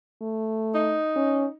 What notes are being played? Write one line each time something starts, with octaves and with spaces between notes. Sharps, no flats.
A3
D#4
C#4